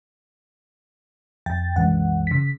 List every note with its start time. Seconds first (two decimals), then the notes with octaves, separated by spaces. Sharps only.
1.46 F2 G5 A6
1.76 C2 F#2 E3 G#3 F#5
2.27 C#3 B6